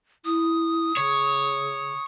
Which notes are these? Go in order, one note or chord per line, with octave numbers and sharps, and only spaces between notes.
E4 D#6
C#3 C#5